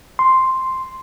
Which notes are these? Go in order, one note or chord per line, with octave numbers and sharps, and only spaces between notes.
C6